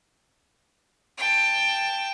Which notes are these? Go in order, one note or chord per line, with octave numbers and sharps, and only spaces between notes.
G5 A5